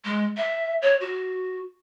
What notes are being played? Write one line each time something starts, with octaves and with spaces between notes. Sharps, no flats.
G#3
E5
C#5
F#4